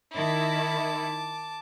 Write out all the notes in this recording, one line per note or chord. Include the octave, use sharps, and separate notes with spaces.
D#3 E4 A5 D6